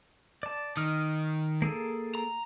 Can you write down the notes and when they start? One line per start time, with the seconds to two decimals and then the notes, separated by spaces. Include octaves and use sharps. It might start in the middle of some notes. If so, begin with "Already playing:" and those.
0.43 D5 A5
0.77 D#3 D#6 F6
1.62 A#3 G#4 A4
2.15 A#5